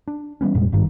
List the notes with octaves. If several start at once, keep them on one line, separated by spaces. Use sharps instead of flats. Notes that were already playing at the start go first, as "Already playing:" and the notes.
D4
E3 G3 B3 C#4
F1 A#2 G3 G#3
G#1 G2 D#3